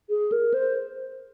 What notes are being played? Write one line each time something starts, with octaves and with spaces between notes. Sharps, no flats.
G#4
A#4
C5